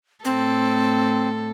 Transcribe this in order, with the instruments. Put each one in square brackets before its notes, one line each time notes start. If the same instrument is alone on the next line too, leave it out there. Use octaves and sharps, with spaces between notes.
[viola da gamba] A2 A4 [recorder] C4